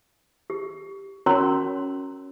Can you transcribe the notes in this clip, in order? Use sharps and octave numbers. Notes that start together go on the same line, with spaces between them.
G4
C#4 F#4 A#4 C#5 A#5 C6